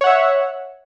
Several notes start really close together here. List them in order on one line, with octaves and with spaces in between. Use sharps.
C#5 F#5 E5